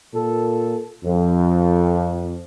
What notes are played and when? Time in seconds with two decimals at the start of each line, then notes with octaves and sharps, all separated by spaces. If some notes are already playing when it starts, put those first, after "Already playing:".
0.14 A#2 A4
1.04 F2